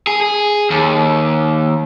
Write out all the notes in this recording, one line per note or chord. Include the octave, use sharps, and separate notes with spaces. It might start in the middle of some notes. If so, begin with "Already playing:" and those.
G#4
G#4
D#2